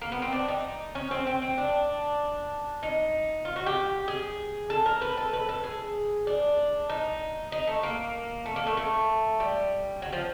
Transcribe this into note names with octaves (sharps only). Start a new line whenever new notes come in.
A#3
B3
C4
D4
D#4
C#4
C4
C4
C4
D4
D#4
F4
F#4
G4
G#4
A4
A#4
B4
A4
B4
A4
G#4
D4
D#4
D#4
A3
A#3
A3
A#3
A3
A3
G3
F#3
F3